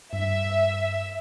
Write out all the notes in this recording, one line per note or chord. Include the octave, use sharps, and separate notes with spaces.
G2 E5